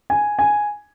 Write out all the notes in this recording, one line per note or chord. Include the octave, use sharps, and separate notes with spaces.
G#5
G#5